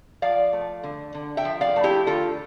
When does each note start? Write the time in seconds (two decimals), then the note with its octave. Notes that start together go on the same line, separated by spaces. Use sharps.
0.22 F3 D5 F5
0.53 A3
0.83 D3
1.14 D3
1.37 E5 G5
1.45 F3
1.61 D5 F5
1.76 A3
1.83 E4 G4
2.07 D3 F4 A4